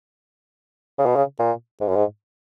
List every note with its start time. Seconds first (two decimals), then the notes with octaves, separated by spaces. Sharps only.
0.98 C#3
1.06 B2
1.16 C#3
1.39 A#2
1.81 G#2
1.88 F#2
1.96 G#2